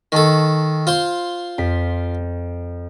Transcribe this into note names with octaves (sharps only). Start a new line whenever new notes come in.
D#3 A4 A5 B5 C#6
F4 C5 C6
F2 B6